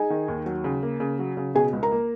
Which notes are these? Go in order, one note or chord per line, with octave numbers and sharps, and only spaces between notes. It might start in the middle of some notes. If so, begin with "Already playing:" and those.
Already playing: D#4 G#4 G#5
D#3
D#2
F#3
C#3
A#3
C#3
F#3
C#3
B2 G#4 G#5
C#2
A#4 A#5
A#3